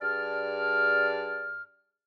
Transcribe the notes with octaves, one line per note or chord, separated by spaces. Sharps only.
G2 G#4 D5 A5 F6